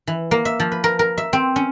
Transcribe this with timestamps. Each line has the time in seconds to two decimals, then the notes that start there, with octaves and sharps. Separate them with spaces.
0.07 E3
0.31 A#3
0.45 E5
0.60 F3
0.72 B4
0.84 A#4
0.99 A#4
1.18 E5
1.33 C4
1.56 C#4